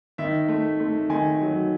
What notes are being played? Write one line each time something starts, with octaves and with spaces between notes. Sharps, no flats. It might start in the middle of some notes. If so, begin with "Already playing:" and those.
D#3 E5
A3
A3
D#3 G#5
F#3